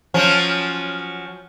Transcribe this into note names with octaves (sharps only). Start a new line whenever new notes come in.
F3 F#3 C#4